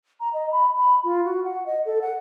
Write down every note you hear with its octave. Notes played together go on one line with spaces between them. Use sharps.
A#5
D#5
B5
B5
F4
F#4
F#5
D#5
A4
F#5